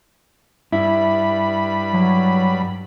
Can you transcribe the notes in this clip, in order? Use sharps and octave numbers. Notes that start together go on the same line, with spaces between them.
G2 E4 B5
F#3